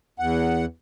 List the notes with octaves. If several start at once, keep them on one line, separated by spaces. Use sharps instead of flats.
E2 F#5